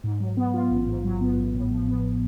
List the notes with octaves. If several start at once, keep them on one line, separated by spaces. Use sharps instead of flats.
G#2
F#3
B3
F4
A1
G#2
F#3
B3
A1
A2
F3
B3